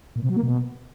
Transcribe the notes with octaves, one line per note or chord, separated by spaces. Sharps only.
A#2
C3
F#3
A#3
B2